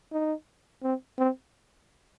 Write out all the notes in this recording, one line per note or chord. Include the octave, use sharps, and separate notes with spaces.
D#4
C4
C4